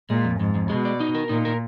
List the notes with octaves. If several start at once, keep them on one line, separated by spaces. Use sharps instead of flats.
A#2 G#3
F2
F2 G#2
F2
B2 G#3
D5
D#4
A#4
A#2 D#4
A#4